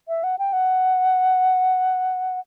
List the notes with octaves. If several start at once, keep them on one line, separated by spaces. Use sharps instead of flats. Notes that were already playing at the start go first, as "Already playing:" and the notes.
E5
F#5
G5
F#5